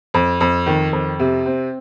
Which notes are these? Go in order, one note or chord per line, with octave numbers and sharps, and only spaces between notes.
F2
F2
D#3
F2
C3
C4